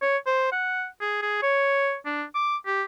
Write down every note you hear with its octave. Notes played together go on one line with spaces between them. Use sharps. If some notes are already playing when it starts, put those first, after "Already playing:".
C#5
C5
F#5
G#4
G#4
C#5
D4
D6
G4